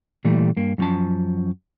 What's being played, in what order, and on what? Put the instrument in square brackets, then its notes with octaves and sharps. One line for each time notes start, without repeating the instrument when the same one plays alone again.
[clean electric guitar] A#2 E3 G3 A3
G2 A#3
F#2 D#3 F3 C#4 A5